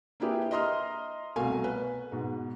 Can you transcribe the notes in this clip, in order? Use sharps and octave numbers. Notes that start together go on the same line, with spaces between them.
A#3 D4 E4 G4 G#4 B4
D#5 E5 A#5 C6 D#6 F6
C2 B2 A3 F#4 F5 G#5
B4
G#2 B2